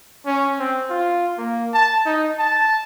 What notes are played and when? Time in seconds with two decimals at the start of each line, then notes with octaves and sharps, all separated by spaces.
0.26 C#4
0.58 C4
0.90 F4
1.38 A#3
1.73 A5
2.05 D#4
2.39 A5